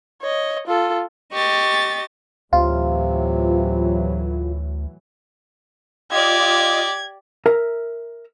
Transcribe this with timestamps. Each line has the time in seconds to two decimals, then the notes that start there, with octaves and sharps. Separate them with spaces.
0.22 C#5 D#5
0.67 F4 A4
1.33 G4 D#5 C#6 A6
2.53 D2 A2 C3 E3 F#3 F4
6.12 F4 G4 D5 D#5 G#6
7.46 A#4 E5 A#5